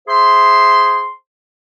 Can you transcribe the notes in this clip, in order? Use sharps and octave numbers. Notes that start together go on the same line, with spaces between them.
G#4 C5 E5 C6